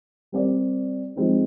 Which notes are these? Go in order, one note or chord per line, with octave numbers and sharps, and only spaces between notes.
G3 C4 G4 A#4 D5
F3 G#3 C4 D#4